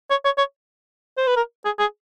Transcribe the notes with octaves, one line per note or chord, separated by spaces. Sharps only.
C#5
C#5
C#5
C5
B4
A#4
G#4
G#4